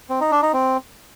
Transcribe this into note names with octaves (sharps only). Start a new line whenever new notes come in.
C4
D#4
D4
D#4
C4